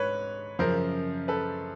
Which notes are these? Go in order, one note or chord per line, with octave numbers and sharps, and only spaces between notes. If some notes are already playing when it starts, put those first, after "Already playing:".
Already playing: G#2 B4 C#5
F#2 C#3 F3 A#4 C5
A4 B4